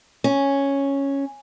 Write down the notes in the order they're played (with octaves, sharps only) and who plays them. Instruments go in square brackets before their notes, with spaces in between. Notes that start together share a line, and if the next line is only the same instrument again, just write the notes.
[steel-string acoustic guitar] C#4